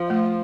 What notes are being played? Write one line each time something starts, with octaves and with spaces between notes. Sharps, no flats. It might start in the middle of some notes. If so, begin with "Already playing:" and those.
Already playing: F3
A3